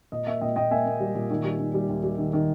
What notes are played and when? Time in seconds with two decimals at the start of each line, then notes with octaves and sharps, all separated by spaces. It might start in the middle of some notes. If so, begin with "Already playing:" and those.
0.12 A#2 D#5
0.27 A#3 E5
0.41 A#2 D#5 G5
0.56 A#2 D#5 G5
0.71 A#3 E5 G#5
0.86 A#3
1.00 G3
1.15 A#2
1.30 D#3
1.44 G3
1.59 D#3
1.74 G3
1.89 D#2
2.04 G3
2.18 D#3
2.33 D#3